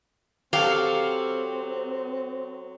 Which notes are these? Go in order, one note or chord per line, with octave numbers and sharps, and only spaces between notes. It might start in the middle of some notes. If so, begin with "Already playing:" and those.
F#3 C4 G4 A4 F5